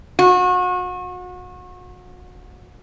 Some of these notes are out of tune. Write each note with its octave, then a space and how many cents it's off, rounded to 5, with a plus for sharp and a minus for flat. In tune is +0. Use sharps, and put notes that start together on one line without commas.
F#4 -35